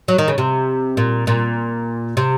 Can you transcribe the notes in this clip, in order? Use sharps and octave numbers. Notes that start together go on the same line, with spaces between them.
F#3
D#3
C#3
C3
A#2
A#2
C3